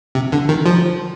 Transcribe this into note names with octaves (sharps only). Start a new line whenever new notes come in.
C3
D3
D#3
F3